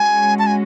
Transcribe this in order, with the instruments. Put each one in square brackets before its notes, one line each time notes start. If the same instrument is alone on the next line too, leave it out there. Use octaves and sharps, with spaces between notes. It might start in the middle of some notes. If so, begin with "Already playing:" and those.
Already playing: [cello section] G#3 C#4 F#4 [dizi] G#5
[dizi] A5
G#5